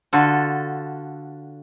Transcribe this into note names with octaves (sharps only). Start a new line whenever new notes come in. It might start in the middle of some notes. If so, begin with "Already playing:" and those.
D3 F4 F#4 A4